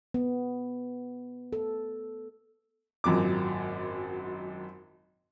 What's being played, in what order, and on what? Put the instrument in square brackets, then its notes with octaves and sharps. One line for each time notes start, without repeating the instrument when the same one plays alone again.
[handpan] B3
A4
[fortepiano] G#1 F#2 A#2 D6